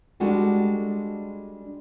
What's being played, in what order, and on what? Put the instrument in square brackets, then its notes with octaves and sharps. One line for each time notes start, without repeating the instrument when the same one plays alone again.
[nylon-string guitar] G3 G#3 D4 F#4 G4 A4